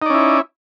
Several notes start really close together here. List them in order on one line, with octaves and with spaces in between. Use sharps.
D#4 D5 C#4 E4